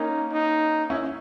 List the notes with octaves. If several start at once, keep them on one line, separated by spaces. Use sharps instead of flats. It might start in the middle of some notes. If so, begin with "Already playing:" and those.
Already playing: A#3 C#4 D#4
D#4
C#4 E4